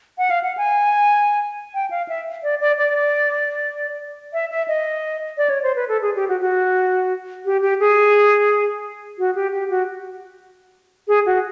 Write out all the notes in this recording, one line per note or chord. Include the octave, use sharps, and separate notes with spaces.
F#5
F5
F#5
G#5
G5
F5
E5
D5
D5
D5
E5
E5
D#5
D5
C#5
C5
B4
A4
G#4
G4
F#4
F#4
G4
G4
G#4
F#4
G4
G4
F#4
G#4
F#4